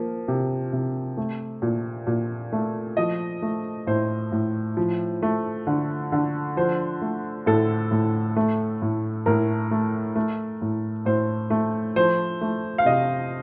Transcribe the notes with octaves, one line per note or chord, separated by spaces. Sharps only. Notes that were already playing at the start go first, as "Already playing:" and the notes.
Already playing: F3 A#3
C3
C3
A3
A#2
A#2
A3
F3 D#5
A3
A2 C5
A2
F3
A3
D3
D3
F3 C5
A3
A2 A4
A2
A3
A2
A2 A#4
A3
A3
A2
A2 C5
A3
F3 C5
A3
F5
C3 D#5